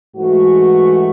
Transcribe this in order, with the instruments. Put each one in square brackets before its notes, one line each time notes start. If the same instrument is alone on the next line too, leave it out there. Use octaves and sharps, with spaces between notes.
[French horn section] G#2 E3 A3 F#4